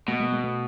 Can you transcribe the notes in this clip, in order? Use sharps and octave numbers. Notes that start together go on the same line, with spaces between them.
B2 G#3 A#3
G#3 A#3
G#3 A#3
A3 B3